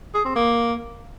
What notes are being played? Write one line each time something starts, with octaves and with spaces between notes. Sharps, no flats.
G#4
C4
A#3